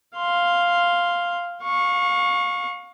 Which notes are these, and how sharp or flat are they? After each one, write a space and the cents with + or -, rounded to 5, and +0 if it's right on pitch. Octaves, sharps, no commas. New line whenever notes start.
F5 +0 C6 +0
F5 +30 C#6 -10